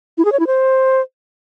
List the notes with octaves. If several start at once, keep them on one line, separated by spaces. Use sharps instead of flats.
E4
G#4
C#5
E4
C5